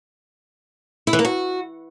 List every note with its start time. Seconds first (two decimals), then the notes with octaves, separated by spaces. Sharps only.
1.07 E4
1.13 E3
1.19 A#3
1.25 F#4